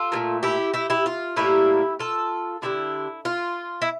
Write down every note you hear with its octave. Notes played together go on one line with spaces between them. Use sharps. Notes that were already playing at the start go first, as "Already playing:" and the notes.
Already playing: F4 A4
A#2 F3 A3
E4 G4
E4 G4
E4 G4
F4
A2 G3 A#3 E4 G4
F4 A4
D3 G3 D4 E4 G4
F4
E4